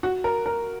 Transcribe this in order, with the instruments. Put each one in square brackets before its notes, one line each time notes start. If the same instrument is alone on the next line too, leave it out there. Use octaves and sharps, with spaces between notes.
[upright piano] F#4
A#4
A#4